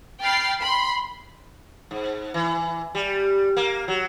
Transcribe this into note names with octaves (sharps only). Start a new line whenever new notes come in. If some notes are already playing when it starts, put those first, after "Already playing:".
G5 B5 F6 A6 C7
B5 C6
G#2
E3
G3
A#3
F#3